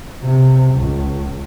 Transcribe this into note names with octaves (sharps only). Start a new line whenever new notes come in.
C3
C#2